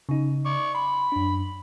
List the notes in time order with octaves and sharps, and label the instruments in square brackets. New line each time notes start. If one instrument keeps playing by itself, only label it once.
[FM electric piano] C#3 D#4
[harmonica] D5 C#6
[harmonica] B5 [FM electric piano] C6
[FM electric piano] F#2 D4